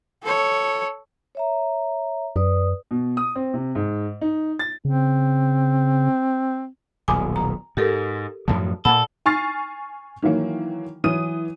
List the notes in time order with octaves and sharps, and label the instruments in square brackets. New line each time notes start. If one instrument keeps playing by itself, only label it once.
[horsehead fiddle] A4 C#5
[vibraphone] C#5 E5 A#5
[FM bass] F#2 [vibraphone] B4 D5 D#6
[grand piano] B2
D#6
C4
C3
G#2
D#4
A6
[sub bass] C#3 [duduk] C4
[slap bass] D#1 B1 [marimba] G#5 D6 D#6
[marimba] A#5
[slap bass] G#2 [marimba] G4 A4 A#4
[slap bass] F#2 A2 F3 [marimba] A5
[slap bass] A#2 A#3 [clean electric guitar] A4 [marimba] F#5 B5
[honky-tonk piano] G#5 C#6 F6 A6 C7
D#3 E3 F#3 A#3
E3 F#3 D#6 D#7